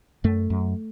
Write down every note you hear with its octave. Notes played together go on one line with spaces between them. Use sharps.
F#2 A3
F#2